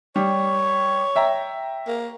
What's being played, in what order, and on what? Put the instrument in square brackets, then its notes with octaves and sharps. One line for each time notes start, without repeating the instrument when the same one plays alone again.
[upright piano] G3 [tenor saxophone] C#5
[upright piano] E5 G5 A#5
[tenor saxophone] A#3